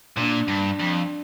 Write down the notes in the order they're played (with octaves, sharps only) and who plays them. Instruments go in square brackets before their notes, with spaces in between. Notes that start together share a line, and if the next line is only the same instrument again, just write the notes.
[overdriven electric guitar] A#2 [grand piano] D4
[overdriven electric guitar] G2
F2